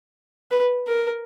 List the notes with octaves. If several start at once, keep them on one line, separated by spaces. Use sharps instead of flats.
B4
A#4